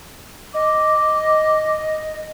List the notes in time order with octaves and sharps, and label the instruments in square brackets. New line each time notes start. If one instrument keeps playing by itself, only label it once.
[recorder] D#5 [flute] D6